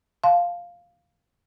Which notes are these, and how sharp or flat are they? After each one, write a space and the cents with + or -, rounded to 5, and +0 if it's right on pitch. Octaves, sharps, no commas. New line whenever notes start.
F5 +0 A5 -20 C6 +0